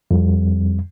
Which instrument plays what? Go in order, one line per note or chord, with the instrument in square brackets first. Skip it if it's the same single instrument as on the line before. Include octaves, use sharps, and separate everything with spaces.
[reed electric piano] F2 G3